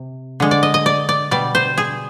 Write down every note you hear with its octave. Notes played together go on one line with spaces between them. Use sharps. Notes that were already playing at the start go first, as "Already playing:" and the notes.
Already playing: C3
D3 G#3
D5
D#5
D#5
D5
D5
B2 G3 D5
C5
G#4